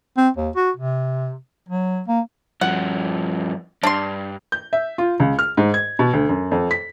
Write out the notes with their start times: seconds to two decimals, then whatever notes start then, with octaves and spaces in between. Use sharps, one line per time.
0.17 C4
0.37 D#2
0.56 F#4
0.76 C3
1.69 F#3
2.08 A#3
2.61 G2 F3 F#5
3.83 G2 D4 C6
4.52 G6
4.73 E5
4.98 F4
5.20 C#2
5.39 F6
5.57 G#2
5.74 G#6
5.99 B2
6.13 D2
6.29 F#2
6.51 F2
6.71 B6